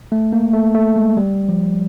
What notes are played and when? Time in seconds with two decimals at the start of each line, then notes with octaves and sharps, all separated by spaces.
0.12 A3
0.33 A#3
0.53 A3
0.75 A3
0.96 G#3
1.17 G3
1.49 F3